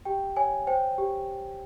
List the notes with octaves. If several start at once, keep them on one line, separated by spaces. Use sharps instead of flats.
G4 G5
C#5 G#5
C5 G5
G4